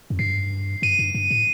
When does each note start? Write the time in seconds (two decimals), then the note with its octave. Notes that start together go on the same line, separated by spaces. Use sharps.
0.10 F2
0.19 G2 C7
0.82 G2 D#7
0.99 G2
1.14 G2
1.30 A2